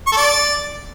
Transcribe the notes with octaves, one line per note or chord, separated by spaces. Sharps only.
C#6
A4
D5